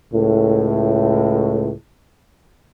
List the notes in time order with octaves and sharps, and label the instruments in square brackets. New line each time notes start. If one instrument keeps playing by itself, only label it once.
[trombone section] C#2 A2